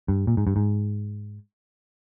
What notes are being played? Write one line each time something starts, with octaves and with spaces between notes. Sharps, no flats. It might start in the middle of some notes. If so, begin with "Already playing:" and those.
G2
A#2
G#2
G2
G#2